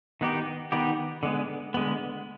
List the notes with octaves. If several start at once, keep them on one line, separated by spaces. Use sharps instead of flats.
D#3 B3 D#4 G4
D#3 B3 D#4 G4
D3 G#3 B3
D3 G#3 B3